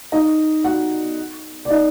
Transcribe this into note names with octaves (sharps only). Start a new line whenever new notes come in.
D#4 D#5
F#4 F#5
D5
D#4 D#5